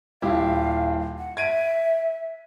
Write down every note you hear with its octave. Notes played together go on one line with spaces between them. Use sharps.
D#1 E4 G4 F5
F#5
E5 G#6 D7 D#7